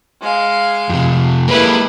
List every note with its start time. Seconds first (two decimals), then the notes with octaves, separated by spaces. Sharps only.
0.22 G#3 F5
0.89 F2 C3
1.48 G#3 A#3 E4 B4